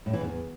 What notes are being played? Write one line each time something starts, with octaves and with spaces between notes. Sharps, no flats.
A2
E3
E2